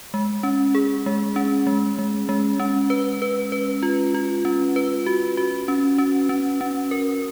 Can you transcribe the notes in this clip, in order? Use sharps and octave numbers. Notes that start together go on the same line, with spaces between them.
G#3
C#4
G#4
G#3
C#4
G#3
G#3
G#3
C#4
B4
B4
B4
F4
F4
C#4
B4
F#4
F#4
C#4
C#4
C#4
C#4
A#4